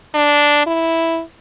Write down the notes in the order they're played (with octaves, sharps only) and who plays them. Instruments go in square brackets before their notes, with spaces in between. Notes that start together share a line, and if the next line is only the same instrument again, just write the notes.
[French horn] D4
E4